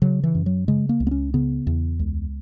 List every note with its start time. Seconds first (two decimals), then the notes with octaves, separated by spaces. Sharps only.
0.02 C#3 F#3
0.23 E3
0.35 F#2
0.46 F#3
0.68 C#3 G#3
0.89 A#3
1.00 C#2
1.07 B3
1.11 C#4
1.34 C#3 B3
1.67 E2
1.99 C#2